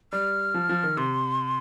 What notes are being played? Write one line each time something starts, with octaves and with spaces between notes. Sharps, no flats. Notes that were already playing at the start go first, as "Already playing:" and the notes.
G3 F6
F3
F3
D#3
C3 C6